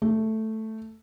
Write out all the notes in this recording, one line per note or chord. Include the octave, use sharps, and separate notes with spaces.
A3